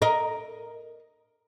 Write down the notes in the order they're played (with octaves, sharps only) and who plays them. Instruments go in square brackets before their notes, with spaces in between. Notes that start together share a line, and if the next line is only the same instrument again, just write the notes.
[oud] A#4 D#5